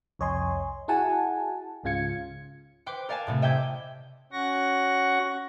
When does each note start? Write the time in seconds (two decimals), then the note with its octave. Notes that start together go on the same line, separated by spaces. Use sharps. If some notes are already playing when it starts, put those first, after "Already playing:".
0.19 C2 F2 C#5 D#5 G#5 C6
0.88 E4 F#4 G#4 F#5 G#5 A5
1.84 C#2 G#2 C#3 F4 G#6 C#7
2.86 B4 C5 G5 D6
3.09 A#4 D5 F5 G#5 A5
3.27 A2 C3 A3
3.42 D#5 E5 G5 D6 G6 G#6
4.32 C#4 F#4 F#5 C#6 A#6